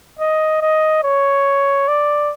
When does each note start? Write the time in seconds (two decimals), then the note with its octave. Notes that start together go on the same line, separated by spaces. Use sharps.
0.19 D#5
0.62 D#5
1.03 C#5
1.88 D5